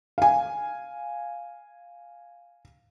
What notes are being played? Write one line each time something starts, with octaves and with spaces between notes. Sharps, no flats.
F5 G#5